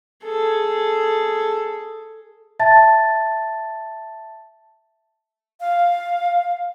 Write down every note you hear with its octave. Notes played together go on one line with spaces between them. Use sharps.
G#4 A4
E5 A5 A6
F5